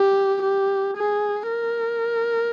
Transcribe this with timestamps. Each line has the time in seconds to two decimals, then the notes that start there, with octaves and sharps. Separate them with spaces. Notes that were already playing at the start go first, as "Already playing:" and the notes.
Already playing: G4
0.43 G4
0.97 G#4
1.50 A#4